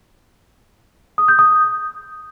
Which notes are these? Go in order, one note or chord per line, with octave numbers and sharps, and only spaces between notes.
D#6
G6
D#6